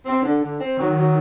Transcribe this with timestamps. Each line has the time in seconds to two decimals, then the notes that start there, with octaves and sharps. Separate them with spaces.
0.05 C4
0.22 D3
0.41 D3
0.59 C4
0.77 D#3 F#3
0.96 F#3